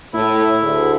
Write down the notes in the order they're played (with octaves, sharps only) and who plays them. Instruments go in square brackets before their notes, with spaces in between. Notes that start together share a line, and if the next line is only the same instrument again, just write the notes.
[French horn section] A2 [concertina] E4
[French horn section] D2 G#4